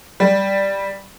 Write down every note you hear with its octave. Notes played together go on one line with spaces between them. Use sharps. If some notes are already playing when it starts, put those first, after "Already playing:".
G3